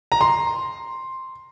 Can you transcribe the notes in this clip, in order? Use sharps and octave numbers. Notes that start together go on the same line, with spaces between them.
A#5
C6